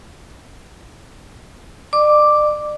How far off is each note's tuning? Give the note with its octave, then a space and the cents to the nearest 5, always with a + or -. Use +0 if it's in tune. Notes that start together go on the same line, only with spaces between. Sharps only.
D5 +40 D6 +0